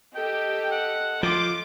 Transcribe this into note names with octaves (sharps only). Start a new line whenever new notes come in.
G4 A4 D#5 G5
F#5
F3 F4 D6